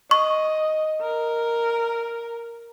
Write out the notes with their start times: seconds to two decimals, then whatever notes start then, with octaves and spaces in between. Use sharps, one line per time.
0.11 D#5 C#6
1.01 A#4